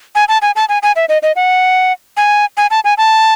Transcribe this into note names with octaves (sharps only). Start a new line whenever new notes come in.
G#5
A5
G#5
A5
G#5
G#5
E5
D#5
D#5
F#5
G#5
G#5
A5
G#5
A5